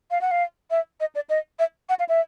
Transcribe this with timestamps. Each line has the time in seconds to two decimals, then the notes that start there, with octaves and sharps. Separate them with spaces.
0.11 F5
0.21 F#5
0.31 F5
0.71 E5
1.00 D#5
1.15 D5
1.29 D#5
1.59 E5
1.89 F#5
1.99 F5
2.09 E5